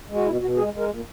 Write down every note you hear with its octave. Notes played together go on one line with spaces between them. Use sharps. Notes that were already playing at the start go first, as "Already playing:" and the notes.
G#3
F#4
B2 E4
B2 F#4
G#3 G#4
G#3
A#4
A#2